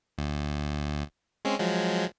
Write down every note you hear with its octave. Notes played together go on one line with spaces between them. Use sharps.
D2
G#3 C4 C#4
F3 F#3 G#3